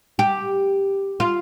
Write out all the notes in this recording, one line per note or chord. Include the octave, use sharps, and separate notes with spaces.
G4
F4